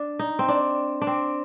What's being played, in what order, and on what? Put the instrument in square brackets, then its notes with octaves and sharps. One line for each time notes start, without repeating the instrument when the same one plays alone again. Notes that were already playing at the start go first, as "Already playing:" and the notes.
Already playing: [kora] D4
D#4
C4
D4
D4
C4